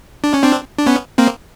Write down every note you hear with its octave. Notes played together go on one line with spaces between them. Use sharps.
D4
C#4
C4 D4
D4
B3 C#4
A#3 C4